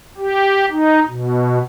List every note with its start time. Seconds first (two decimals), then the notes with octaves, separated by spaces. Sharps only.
0.18 G4
0.71 D#4
1.08 B2